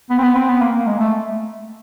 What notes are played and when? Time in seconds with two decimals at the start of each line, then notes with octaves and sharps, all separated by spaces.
0.10 B3
0.18 C4
0.23 B3
0.35 C4
0.48 B3
0.61 A#3
0.73 A#3
0.86 G#3
0.99 A3